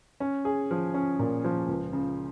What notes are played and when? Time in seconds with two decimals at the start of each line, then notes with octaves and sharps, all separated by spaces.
0.20 C#4
0.45 G#4
0.71 F3
0.94 C#4
1.19 A#2
1.44 F3
1.68 C#2
1.93 C#3